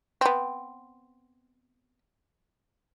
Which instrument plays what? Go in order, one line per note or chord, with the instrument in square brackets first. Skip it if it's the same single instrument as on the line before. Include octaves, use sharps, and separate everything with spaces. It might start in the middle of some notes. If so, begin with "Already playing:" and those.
[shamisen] B3 C4